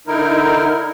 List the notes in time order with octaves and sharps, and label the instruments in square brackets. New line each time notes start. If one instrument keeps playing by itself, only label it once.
[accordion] D3 D#4 E4 A#4